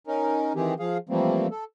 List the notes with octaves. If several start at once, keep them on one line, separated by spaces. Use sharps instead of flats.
C#4 D#4 A#4
D#3 E3 C4 G4 G#4
F3 G#4 F5
E3 F3 G3 A3 A#3 C4
A4